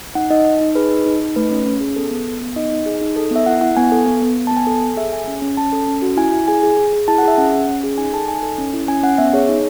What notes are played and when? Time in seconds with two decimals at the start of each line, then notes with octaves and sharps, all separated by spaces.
0.15 D#4 F#5
0.30 D#4 D#5
0.46 D#4
0.61 D#4
0.75 G#4 B4
0.91 D#4
1.06 D#4
1.20 D#4
1.36 A3 B4
1.51 C#4
1.66 C#4
1.81 G#4
1.96 B3 A4
2.11 B3
2.26 B3
2.41 B3
2.56 D#4 D#5
2.71 D#4
2.86 G#4
3.01 D#4
3.16 A4
3.31 B3 E5
3.46 E4 F#5
3.61 E4 F#5
3.77 B3 G#5
3.92 A4
4.06 B3
4.22 B3
4.37 B3
4.47 A5
4.52 B3
4.57 G#5
4.67 A4
4.82 A4
4.97 G#4 E5
5.13 G#4 G#5
5.27 C#4
5.42 C#4
5.57 C#4 A5
5.73 A4
5.88 C#4
6.02 F#4
6.17 E4 G#5
6.32 E4
6.48 G#4 G#5
6.63 G#4
6.77 G#4
6.93 G#4
7.08 E4 A5
7.18 F#5
7.23 G#4 E5
7.38 C#4 F#5
7.53 C#4
7.68 C#4
7.84 G#4
7.98 D#4 G#5
8.13 A4 A5
8.28 D#4 G#5
8.43 A4
8.58 C#4
8.73 E4
8.88 C#4 G#5
9.03 C#4 F#5
9.18 B3 E5
9.33 G#4 C#5
9.49 D#4